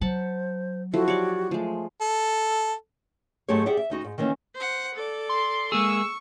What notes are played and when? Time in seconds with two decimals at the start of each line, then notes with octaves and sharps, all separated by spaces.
0.01 F#3 C5 F#5 A5 B5
0.93 F3 E4 F#4 A4
1.08 G4 C#5 D5
1.51 F3 G#3 A3
2.01 A4
3.48 G#2 F#3 A3 C4 G4 C#5
3.66 G4 G#4 D5 E5 F#5
3.77 E5
3.90 D2 D#4 F#4
4.04 G#2
4.18 D#3 E3 A#3 C#4
4.55 C5 F#5
4.95 A4 D5
5.29 C6
5.72 G#3 A#3 G#4 C#6 E6